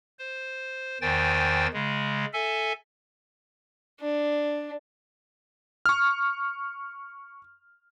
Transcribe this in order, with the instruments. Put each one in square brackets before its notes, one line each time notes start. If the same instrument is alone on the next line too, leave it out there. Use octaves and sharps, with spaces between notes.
[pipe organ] C5
E2 D#3 C5 G5 G#5 A6
C#3 G#3
A4 E5 G#5
[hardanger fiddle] D4
[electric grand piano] C#6 F6